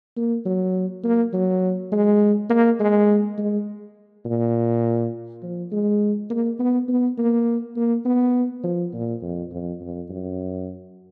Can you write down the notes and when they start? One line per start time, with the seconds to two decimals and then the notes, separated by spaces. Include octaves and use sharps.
0.17 A#3
0.46 F#3
1.04 A#3
1.33 F#3
1.92 G#3
2.50 A#3
2.80 G#3
3.38 G#3
4.25 A#2
5.43 F3
5.72 G#3
6.30 A#3
6.59 B3
6.89 B3
7.18 A#3
7.76 A#3
8.05 B3
8.64 F3
8.93 A#2
9.23 F2
9.52 F2
9.80 F2
10.10 F#2